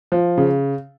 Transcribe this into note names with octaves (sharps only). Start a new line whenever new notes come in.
F3
C#3